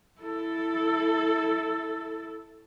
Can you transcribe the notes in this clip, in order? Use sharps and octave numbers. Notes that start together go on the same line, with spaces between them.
E4 A4